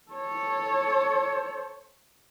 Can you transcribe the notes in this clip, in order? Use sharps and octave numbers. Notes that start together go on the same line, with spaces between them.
A4 C#5